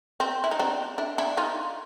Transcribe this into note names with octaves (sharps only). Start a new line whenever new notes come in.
C4
E4
D#4
C4 D4
D4 E4
D4 E4
D#4 F4